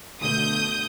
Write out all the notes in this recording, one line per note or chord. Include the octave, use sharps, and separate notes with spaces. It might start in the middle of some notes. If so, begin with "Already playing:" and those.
B2 D3 A3 D#6 G6